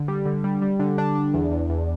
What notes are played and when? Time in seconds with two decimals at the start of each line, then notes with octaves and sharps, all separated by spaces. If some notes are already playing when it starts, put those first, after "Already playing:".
Already playing: D3
0.08 G3
0.25 D3
0.44 G3
0.62 G3
0.79 D3
0.98 D4
1.15 D4
1.34 E2
1.51 E2
1.69 E2